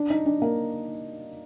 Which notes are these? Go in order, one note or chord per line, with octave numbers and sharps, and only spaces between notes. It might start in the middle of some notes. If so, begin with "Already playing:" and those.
Already playing: D4
D#4
D4
A#3